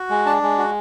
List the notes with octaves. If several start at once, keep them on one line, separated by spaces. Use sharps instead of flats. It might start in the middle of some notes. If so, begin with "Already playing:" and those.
Already playing: F#4
G#3
D4 A5
G#3
F#4